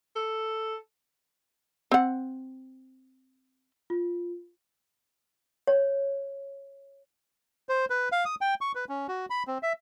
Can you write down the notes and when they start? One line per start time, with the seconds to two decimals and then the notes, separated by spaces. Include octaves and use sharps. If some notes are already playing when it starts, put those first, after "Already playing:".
0.16 A4
1.92 C4 F#5
3.90 F4
5.67 C#5
7.69 C5
7.90 B4
8.12 F5
8.25 D#6
8.41 G5
8.61 C#6
8.75 B4
8.89 C#4
9.08 F#4
9.30 B5
9.47 C4
9.63 E5